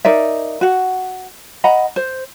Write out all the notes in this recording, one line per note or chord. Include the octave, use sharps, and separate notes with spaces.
D#4 A#4 D5 E5
F#4 F#5
D#5 F#5 A#5 B5
C5